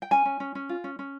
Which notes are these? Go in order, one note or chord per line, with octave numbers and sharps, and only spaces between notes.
G5
C#4 G#5
C#4
C#4
C#4
F4
C#4
C#4